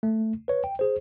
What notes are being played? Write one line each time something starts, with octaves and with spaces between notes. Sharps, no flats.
A3
B4 C#5
G5
G#4 C5